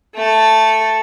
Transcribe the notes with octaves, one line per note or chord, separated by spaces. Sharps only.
A3 A4